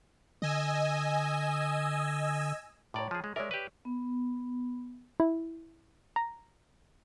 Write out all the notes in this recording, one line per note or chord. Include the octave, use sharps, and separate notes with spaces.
D3 D#5 G#5 E6
A2 C#5 D5 A#5 D6
F3 G#4
G#3
G#3 A#4 C#5 D5 E5
G4 B4
B3
E4
A#5